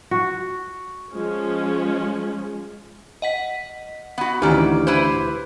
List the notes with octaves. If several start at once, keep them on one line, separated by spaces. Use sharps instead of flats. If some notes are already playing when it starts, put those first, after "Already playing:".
F#4
F3 G#3 C#4
D#5 F#5 B6
B3 F#4
D2 D#3 E3 C#4 G4 D6 F6
E4 B4 C5